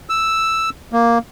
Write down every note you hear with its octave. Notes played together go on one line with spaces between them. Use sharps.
E6
A#3